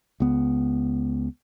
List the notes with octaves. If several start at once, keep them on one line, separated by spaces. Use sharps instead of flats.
C#2 B3